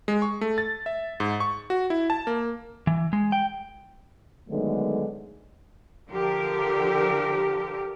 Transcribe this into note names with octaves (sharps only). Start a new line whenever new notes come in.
G#3
C#6
A3
A6
E5
G#2
C#6
F#4
E4
A5
A#3
E3
G#3
G5
D3 D#3 F#3 G#3 A3 B3
D3 F3 G4 A#4